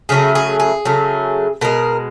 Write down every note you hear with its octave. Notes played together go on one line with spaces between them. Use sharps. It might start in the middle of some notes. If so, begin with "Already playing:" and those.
C#3 F#3 A3 G#4
G#4
G#4
C#3 F#3 A3
B2 G#3 A#4